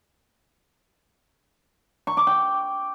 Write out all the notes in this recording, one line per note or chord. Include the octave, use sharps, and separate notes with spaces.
C#6
D6
G5